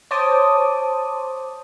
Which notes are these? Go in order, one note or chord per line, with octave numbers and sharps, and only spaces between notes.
C5 C#5 A5 D6 D#6